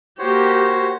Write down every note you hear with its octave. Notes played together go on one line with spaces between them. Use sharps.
A#3 F#4 G4 C5 C#5